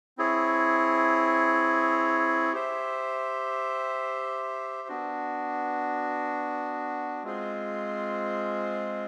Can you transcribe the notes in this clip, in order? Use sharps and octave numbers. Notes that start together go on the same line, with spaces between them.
C4 E4 G#4 C#5
G4 C5 E5
B3 D4 F#4
G#3 C4 F4 G#4 C5